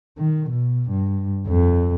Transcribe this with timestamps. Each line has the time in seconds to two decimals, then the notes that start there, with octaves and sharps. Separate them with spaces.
0.18 D#3
0.50 B2
0.90 G2
1.47 F2